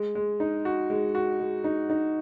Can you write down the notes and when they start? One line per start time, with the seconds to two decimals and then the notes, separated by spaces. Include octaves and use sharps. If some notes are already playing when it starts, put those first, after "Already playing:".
Already playing: G#3
0.15 G#3
0.40 D#4
0.65 F#4
0.90 G#3
1.15 F#4
1.40 G#3
1.64 D#4
1.90 D#4